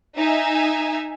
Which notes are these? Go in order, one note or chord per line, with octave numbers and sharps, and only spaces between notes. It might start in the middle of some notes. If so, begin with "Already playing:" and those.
D#4 E5 G#5